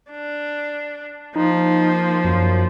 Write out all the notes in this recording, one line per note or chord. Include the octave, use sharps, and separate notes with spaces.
D4
F3 A#3 D#4
F#2